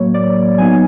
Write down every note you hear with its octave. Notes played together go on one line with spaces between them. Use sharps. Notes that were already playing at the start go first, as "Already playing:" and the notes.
Already playing: A2 F#3 A#3 C#5
D5
F#3 B3 D#4 G#5